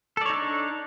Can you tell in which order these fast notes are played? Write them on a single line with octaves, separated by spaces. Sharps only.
A4 D5 C#5 D#4 D4